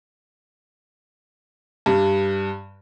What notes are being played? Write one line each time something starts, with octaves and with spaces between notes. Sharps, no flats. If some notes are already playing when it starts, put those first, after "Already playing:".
G2